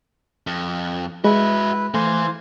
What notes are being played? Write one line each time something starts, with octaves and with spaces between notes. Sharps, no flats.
F2
G#3 E4 F#4 B4 E5
E3 A3 C5 F5 G#5